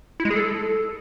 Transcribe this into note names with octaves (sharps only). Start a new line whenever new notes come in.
E4
G#3
G#4
A4